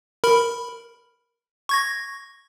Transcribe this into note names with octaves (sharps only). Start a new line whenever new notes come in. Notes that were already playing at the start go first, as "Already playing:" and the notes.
A#4 B5
C#6 G#6 A#6